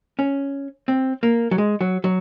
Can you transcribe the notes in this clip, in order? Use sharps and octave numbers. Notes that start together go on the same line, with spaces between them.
C#4
C4
A#3
F#3
G#3
F#3
F#3